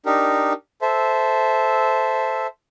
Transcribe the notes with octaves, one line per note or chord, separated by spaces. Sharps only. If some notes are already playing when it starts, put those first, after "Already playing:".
D4 D#4 G4 A#4
A4 C5 E5